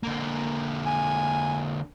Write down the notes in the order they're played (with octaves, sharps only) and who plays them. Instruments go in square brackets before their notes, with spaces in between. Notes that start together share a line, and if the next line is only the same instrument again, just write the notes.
[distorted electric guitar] D3 A#3
[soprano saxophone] G#5